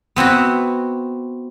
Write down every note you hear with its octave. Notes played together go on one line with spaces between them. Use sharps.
B3 C4 E4 F#4